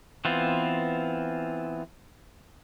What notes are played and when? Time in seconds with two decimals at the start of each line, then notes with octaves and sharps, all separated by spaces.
0.25 E3 B3 C4 F4